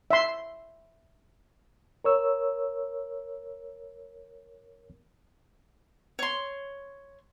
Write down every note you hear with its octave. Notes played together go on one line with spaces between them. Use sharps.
E5 C6
A#4 C#5 E6
C#5 C6